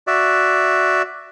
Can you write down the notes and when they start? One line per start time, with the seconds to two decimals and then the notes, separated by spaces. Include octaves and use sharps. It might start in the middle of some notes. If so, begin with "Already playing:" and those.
0.07 F#4 D5 E5